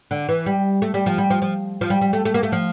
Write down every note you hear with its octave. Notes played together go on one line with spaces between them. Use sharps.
D3
E3
G3
A3
G3
F3
G3
F3
F3
F3
G3
G3
A3
A3
A#3
A3
F3